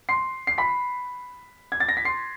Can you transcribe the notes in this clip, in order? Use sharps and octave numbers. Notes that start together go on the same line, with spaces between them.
C6 C7
C7
B5 B6
G#6
A6
A#6
B6
C6 C7